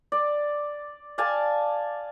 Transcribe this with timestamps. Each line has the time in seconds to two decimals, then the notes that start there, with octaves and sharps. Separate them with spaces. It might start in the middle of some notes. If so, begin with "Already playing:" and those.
0.12 D5
1.18 D5 F5 G#5 A5